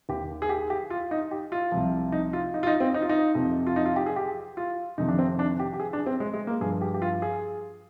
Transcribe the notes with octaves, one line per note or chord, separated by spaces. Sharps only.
D#2 D#3 G4
G#4
G4
G4
F4
D#4
G4
F4
C2 C3 F3
D#4
F4
D#4
F4
D#4
C4
D#4
F4
D#4
F2 C3 F3
F4
D#4
F4
G4
G#4
G4
F4
F2 C3 D#3 D#4
D4
C4
D4
G4
G4
G#4
D4
C4
G#3
G#3
A#3
G2 F3 G#4
G4
G4
F4
G#4